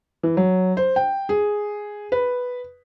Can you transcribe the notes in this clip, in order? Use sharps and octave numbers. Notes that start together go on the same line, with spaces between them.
E3
F#3
C5
G5
G#4
B4